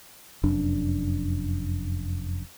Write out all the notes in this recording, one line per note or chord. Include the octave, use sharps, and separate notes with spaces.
F1 F#2 D4